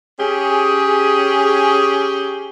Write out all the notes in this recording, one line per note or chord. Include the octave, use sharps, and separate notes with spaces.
C#4 G4 G#4